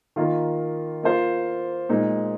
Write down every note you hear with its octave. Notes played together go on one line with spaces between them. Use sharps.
D#3 A#3 F4
A#3 F4 C5
A#2 G#3 D#4